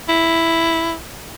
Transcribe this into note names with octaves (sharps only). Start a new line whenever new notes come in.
E4